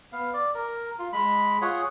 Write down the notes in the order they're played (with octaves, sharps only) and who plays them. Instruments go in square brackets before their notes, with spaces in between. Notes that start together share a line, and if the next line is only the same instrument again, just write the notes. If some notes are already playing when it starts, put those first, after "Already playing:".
[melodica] B3 F5
D5
A#4
F4
G#3 B5
F4 G#4 C#5 F#5